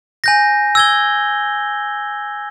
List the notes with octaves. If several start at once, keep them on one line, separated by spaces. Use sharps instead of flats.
G#5 G6 A#6
E6 G#6 G7